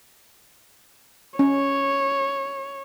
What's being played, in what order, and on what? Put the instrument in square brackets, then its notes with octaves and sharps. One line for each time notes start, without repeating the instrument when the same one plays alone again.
[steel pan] C#4 [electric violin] C#5